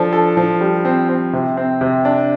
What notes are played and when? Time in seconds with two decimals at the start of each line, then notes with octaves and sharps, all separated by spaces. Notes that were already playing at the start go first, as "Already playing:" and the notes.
Already playing: F3 D4 A4
0.13 A4
0.37 F3
0.61 G3
0.85 C4
1.09 C4
1.33 C3
1.57 C4
1.81 C3
2.05 D4